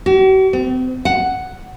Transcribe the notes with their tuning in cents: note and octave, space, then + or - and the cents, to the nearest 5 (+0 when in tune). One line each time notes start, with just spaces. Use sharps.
F#4 +45
C4 -40
F#5 +5